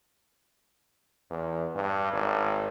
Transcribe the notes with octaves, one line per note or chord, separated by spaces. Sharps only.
E2
G2
G#1